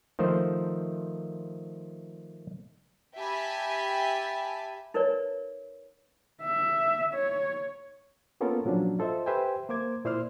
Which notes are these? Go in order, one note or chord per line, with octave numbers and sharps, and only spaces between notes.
D#3 F3 A3 C5
G4 E5 G#5 A5 B5
D#4 A#4 B4 C#5 D5
E5
C#5
A#3 B3 C#4 F4 A4 A#4
A#2 F3 F#3 C#4 D4
F4 A4 C5 D#5 E5
G4 B4 C5 E5 G5 G#5
A#3 C5 D6 G#6
A#2 E4 C5 D5 C6 F6